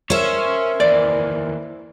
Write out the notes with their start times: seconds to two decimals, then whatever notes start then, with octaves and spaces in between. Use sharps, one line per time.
0.10 C#4 A#4 C5 C#5 E5
0.80 D#2 E3 D5